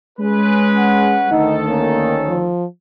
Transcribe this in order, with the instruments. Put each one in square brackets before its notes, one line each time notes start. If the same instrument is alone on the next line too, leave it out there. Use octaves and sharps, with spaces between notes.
[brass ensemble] G#3 C#4 B4
[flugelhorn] F#5
[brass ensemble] D2 D#3 A4 [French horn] D#4
[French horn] A#3 [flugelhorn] C#4
[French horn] F3